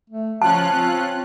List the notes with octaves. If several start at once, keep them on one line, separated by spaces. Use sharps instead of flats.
A3
F3 C#4 F4 A5 F#6
C4